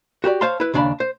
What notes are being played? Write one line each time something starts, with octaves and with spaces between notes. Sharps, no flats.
F#4 G4 A#4 D5
C5 C#5 F5 A5 C6
E4 B4
D#2 C#3 D4 D5 A5 B5
C5